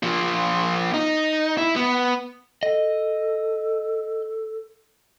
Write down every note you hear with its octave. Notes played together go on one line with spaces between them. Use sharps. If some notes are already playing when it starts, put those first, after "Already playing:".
A#2 F3
D#4
E4
B3
A4 D#5